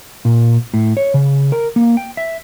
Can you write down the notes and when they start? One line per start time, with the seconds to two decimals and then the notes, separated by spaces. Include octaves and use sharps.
0.25 A#2
0.74 A2
0.97 C#5
1.14 C#3
1.52 A#4
1.76 A#3
1.97 G5
2.17 E5